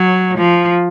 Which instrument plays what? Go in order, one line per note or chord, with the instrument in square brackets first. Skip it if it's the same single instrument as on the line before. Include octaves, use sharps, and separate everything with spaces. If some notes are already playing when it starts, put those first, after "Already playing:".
Already playing: [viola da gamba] F#3
F3